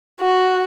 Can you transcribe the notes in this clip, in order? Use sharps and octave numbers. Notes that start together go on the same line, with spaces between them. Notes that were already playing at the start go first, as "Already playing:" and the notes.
F#4